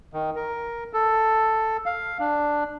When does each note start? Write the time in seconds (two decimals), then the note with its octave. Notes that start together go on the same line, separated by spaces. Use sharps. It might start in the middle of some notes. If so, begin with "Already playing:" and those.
0.13 D#3
0.36 A#4
0.93 A4
1.86 F5
2.20 D4